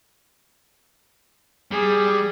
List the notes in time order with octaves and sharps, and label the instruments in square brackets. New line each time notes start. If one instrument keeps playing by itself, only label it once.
[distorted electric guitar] G3 [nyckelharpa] G#4